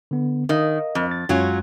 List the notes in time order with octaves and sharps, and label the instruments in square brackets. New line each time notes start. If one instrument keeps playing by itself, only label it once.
[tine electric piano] D3 B3
[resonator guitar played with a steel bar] D#3 [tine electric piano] A#4 D#5 F5
[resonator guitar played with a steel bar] F2
[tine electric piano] A6
[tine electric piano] F#2 G#3 [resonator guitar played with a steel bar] F#3 C#4 F4